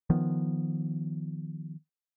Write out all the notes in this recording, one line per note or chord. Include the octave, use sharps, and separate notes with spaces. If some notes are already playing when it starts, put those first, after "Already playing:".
D#3 F3 B3